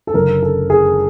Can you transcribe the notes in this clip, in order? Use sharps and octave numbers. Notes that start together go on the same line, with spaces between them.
A4
F#1 F#2 D3 A#4
A4
G#4